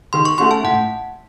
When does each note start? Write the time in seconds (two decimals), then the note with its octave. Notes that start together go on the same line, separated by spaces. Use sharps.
0.13 D#3 C6
0.25 C#6
0.38 A3 C#4 F#4 C6
0.51 A5
0.64 A2 F#5